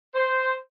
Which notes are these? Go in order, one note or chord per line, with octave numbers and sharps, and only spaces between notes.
C5